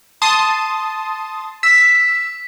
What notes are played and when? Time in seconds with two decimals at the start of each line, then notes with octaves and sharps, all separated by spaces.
0.22 A5 C6 D#6
1.63 E6 B6